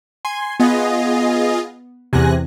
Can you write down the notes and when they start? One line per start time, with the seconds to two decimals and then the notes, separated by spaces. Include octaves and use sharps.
0.25 G#5 C6
0.60 B3 F4 G#4 D#5
2.13 E2 C3 G#5 F#6 A#6